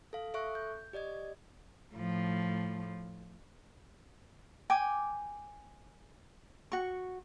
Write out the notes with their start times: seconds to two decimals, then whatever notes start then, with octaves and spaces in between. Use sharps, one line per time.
0.13 A4 F5
0.34 A4 E5 C#6 F#6
0.55 G6
0.93 G4 D5 D#5 G#6
1.95 A2 F3
4.70 G5 G#5 D6
6.72 F#4 C#6